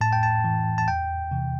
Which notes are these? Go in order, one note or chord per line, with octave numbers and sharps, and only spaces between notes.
A2 A5
G5
A5
E3
A5
E2 G5
C3 E3